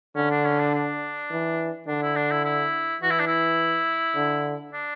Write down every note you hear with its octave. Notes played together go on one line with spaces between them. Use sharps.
D3 C#4
D4
C#4
D4
D4
E3
D3 D4
E4
D4
E4
E4
E3 F#4
E4
D4
E4
D3
D4